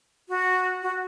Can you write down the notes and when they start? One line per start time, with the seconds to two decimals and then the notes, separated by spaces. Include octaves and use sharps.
0.29 F#4
0.83 F#4